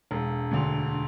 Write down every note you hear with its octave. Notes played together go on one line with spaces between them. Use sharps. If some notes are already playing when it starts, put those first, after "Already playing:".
E1
D2 D3